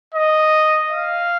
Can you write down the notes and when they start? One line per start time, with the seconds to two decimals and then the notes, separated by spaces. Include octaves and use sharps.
0.14 D#5
0.91 F5